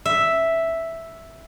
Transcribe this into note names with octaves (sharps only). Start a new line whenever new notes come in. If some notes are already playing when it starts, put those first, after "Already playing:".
E5